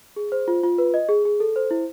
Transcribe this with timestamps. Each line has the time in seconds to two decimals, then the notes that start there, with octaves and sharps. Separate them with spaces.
0.16 G#4
0.32 C5
0.48 F4
0.63 F4
0.78 B4
0.94 D#5
1.09 G#4
1.25 G#4
1.40 A4
1.56 C5
1.71 E4